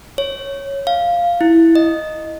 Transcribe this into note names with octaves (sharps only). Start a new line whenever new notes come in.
C#5
F5
E4
D#5